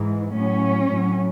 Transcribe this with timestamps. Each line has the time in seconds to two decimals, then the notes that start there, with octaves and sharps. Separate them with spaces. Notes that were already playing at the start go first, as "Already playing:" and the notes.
Already playing: G#2 E3
0.33 A2 F#3 C#4
0.88 A2 F#3